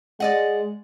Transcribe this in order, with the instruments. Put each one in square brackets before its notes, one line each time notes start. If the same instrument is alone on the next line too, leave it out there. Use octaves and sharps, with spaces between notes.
[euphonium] G#3 [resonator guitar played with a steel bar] D5 D#5 F#5